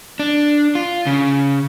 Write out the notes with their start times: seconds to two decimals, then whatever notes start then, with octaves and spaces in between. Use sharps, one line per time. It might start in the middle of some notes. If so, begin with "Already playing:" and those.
0.19 D4
0.75 F4
1.07 C#3